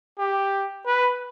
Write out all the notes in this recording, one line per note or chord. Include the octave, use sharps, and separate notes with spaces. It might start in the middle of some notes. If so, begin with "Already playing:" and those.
G4
B4